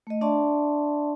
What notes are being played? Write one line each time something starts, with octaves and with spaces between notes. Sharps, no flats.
A3 D#5
D4 D5 E5 A5 C6 C#6